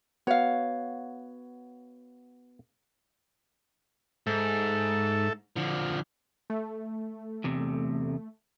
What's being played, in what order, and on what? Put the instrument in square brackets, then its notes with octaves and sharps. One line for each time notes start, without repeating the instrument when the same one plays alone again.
[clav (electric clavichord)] B3 F#4 [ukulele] C#5 F5
[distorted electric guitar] G#2 [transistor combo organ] A4 E5
[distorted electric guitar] D3 F3
[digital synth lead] A3
[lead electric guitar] E2 C3